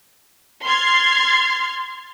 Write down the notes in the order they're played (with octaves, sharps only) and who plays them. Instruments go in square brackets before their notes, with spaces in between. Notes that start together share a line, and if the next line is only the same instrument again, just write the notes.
[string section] C6 F6 G#6 A6 C7